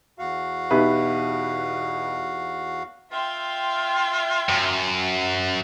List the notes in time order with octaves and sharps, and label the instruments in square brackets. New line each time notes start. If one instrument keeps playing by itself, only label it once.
[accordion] E2 F#4 F5
[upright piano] B2 B4 [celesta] D#4 G4 E5
[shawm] F4 [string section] E5 G5 C6
[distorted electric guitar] F#2